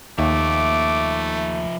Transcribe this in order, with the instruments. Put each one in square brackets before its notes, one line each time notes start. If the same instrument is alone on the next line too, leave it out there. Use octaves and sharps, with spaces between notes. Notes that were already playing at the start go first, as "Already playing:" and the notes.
[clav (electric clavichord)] D#2 [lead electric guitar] F3 E5 [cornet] A3 [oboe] D6